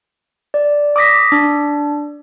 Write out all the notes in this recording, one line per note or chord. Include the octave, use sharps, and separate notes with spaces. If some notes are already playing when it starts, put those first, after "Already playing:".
D5
D6 D#6 A#6 B6
D4